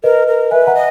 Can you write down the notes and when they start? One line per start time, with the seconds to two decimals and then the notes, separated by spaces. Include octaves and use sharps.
0.04 A#4 B4 D#5
0.27 A#4
0.51 B4 E5 G#5
0.67 F#5 A#5
0.75 D#5